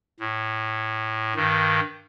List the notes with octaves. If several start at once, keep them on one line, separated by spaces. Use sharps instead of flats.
A2
G2 D#3